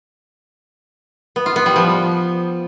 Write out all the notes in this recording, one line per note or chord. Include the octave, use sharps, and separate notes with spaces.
B3
F4
B3
G3
F3